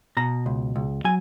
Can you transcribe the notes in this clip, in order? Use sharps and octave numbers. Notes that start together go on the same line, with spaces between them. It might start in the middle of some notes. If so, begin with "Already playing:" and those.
B2 A#5
C#2
C#2
F#3 G#5